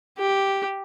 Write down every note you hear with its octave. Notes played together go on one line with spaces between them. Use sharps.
G4